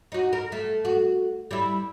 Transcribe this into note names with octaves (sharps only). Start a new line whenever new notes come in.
D#4 F#4
A#4
A3
F#4
G3 E4